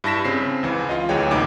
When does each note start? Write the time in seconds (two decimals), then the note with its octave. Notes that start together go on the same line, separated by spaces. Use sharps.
0.04 G2 E4 A5 A#6 B6 E7
0.25 C#3 C4 C7
0.63 C#2 E3
0.89 F4 D#5
1.09 D2 E3 F#3 G#4 C#5 G5
1.31 C2 A#2 D#4 D6